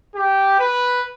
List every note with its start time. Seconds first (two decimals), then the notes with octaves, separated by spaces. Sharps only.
0.15 G4
0.59 B4